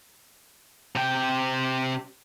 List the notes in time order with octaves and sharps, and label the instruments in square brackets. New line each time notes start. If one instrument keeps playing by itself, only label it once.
[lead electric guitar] C3 G5